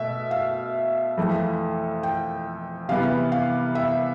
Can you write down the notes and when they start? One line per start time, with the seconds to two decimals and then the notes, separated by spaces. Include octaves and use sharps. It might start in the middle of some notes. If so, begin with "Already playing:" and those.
Already playing: B2 A3 E5
0.31 F5
1.17 F2 E3 A3
2.03 G5
2.89 C3 E3 G3 B3 F5
3.32 F5
3.75 E5